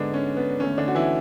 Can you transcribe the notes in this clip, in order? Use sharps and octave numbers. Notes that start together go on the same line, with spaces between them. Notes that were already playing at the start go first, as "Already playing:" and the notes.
Already playing: G#2 D3 G#3 B3 D4
C#4
B3
E2 D3 A3 C#4
D3 D4
F#4
E3 E4